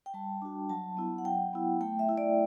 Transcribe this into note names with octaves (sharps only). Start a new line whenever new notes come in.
G5
G3 A5
D4 F#4
F#3 A5
B3 E4
F#5
F#3 G5
B3 E4
A3 G5
E5
E4
D5